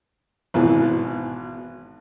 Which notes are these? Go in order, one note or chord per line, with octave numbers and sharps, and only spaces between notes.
G#1 B2 E3